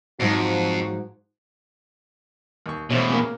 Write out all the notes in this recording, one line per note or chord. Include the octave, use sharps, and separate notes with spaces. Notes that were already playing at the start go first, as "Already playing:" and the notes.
F2 G#2 F3 F#3 F#4
D#2 C#6
E2 B2 A3 C5 C#5
C#3 A#3